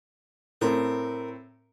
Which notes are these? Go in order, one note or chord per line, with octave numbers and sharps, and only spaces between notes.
A2 C4 A#4